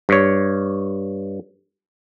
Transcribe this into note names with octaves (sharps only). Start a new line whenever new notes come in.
G2 C#5